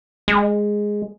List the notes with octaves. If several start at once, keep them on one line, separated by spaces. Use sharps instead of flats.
G#3